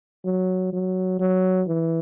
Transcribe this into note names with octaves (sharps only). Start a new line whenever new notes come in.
F#3
F#3
F#3
E3